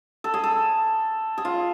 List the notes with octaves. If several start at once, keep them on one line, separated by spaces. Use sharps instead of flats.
A4
G#4
A4
G#4
F4